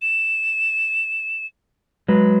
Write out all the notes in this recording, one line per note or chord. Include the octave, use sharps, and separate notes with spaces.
E7
F#3 G#3 B4